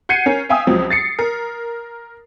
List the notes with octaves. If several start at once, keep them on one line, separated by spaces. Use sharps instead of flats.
F#5 G6 G#6 C7 C#7 D#7
C#4 A#4
E5 F5 G5 G#5 D#6 E6
C#2 F3 F#3 C4
A6 C7 C#7
A#4